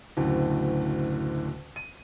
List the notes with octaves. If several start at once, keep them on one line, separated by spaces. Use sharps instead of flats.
F#1 D2 A2
D#7